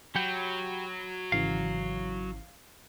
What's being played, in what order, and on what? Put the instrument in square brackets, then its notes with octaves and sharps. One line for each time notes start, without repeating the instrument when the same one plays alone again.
[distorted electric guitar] F#3 [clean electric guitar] G4 F#5 G5 [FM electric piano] B5
[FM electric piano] G#1 C#3 E3 [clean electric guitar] F5